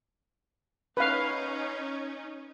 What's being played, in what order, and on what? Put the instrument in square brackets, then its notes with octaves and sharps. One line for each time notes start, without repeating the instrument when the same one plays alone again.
[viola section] C#4 D#4 [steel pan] B4 F5